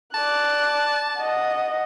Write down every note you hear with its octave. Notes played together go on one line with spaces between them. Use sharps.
D5 A5 F#6
D#5 F#5